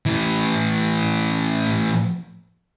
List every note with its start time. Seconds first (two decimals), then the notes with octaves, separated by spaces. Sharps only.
0.06 A2 E3